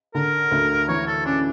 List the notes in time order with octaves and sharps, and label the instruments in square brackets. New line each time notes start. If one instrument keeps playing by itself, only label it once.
[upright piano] D3 [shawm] A#4
[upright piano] D2
[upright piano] E3 [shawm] C#5
[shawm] A4
[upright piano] C#4 [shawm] D4